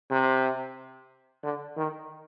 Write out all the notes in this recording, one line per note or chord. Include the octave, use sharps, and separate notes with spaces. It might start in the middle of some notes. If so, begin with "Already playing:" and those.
C3
D3
D#3